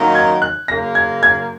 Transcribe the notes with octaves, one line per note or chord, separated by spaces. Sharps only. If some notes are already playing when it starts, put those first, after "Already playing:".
Already playing: F#2 D#3 F#3 A#3 D#4
G#6
F#6
F#2 C#3 A#3 A#6
G#6
G#6